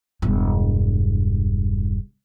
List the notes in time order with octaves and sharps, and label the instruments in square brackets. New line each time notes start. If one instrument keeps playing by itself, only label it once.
[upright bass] E1 G2